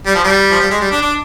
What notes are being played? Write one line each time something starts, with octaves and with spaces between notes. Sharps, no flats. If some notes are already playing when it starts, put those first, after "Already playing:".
G3
F3
G3
F3
G3
G#3
G3
D4
D4